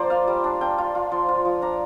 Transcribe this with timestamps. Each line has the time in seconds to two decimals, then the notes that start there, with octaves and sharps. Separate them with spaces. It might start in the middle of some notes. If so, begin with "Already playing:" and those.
Already playing: F3 A#3 D4 C5 D5
0.10 F4 F5
0.28 G3
0.44 D4
0.61 D4 G5
0.78 F4
0.95 F4
1.11 F3 C6
1.29 F4
1.45 F3
1.62 D4 A#5